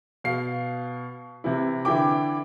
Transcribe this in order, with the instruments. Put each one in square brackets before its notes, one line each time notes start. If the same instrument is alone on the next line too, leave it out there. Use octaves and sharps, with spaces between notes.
[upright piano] B2 F5 C7
C3 E3 E4
D3 E3 E4 G5 D6